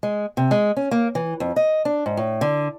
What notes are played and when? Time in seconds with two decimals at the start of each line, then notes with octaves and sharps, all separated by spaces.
0.03 G#3
0.37 C3
0.51 G#3
0.77 C#4
0.91 A#3
1.15 E3
1.40 F2
1.56 D#5
1.85 D4
2.06 G#2
2.17 A2
2.41 D3